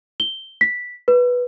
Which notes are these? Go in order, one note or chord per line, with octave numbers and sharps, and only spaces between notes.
G7
B6
B4